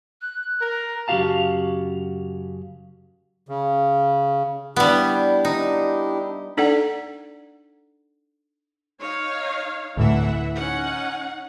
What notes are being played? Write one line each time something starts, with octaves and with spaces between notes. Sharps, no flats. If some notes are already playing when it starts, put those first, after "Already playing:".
F#6
A#4
F#2 C#3 F#4 G4 F5 A5
C#3
G3 B3 D4 E4 G4
D#4
D4 D#4 A4 D5 F#5
D#4 C#5 F5
D2 A2 E3 A3 E5 F#5
C#4 D#4 F#5